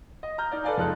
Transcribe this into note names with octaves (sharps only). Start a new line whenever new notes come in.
D#5
A#5 F6 G6
D#4 D5
A4 B4 D5 F5 G#5
F2 G#3 D#4 A4 F#6